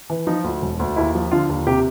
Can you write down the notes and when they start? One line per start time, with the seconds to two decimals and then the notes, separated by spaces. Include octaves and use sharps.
0.10 E3
0.27 F3 D#4
0.44 D2
0.62 E1
0.79 D2
0.96 D#2 E4
1.15 F3
1.31 D3 F4
1.49 D#2
1.67 C3 G4